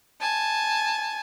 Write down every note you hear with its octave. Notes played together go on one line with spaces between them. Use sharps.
G#5 A5